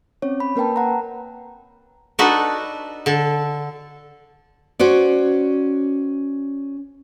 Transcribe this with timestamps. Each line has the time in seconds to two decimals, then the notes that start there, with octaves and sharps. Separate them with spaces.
0.22 C4 C#4 C#5
0.40 B5
0.56 A#3 A#4 B4 G5 A5
0.76 F#5 A#5
2.19 D4 D#4 F#4 A4 B4
3.06 D3 A4
4.79 C#4 F#4 C5 D5